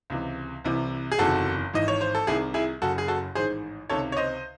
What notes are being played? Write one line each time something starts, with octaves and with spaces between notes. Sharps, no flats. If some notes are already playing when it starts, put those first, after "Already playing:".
C#2 C3 E3
C2 C3 E3
G#4
F#1 E2 C3 D#3 F#4 A4
G#1 G#2 E3 D#5
C#5
C5
A4
C2 C3 D#3 E4 G#4
E4 G#4
F#1 F#2 C#3 F#4 A4
G#4
F#4 A4
A1 G#2 D#3 G#4 C5
C#2 C3 D#3 A4 C#5
C#5
C5 D#5